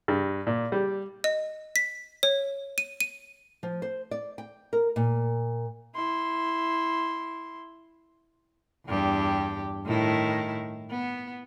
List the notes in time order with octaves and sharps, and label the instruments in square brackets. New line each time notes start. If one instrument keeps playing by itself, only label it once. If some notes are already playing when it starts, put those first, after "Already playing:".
[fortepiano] G2
A#2
G3
[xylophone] D#5
B6
C#5
D#7
D#7
[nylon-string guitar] F3
C5
D5
G5
A#4
A#2
[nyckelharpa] E4 C6
[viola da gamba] E2 G2 G4
A2 D#3 E4
B3